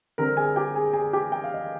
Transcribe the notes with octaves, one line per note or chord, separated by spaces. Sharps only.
D3 G3 C4 A#4 A#5
G#4 G#5
G4 G5
G#4 G#5
G#4 G#5
G4 G5
G5
F5
D#5